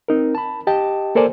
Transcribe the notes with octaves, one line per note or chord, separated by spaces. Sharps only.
C4 D#4 A#4
A5 B5
G4 D#5 G5 A5
A#3 A4 A#4 C5 D5 G#5